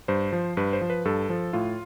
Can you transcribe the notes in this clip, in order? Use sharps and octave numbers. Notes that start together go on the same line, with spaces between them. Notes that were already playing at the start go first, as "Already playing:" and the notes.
G2 C5
F3
G2 B4
C5
F3
B4
G2 A4
F3
A2 F4